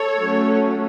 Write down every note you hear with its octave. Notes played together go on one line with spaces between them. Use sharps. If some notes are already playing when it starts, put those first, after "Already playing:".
Already playing: A4 C#5
F#3 A3 C#4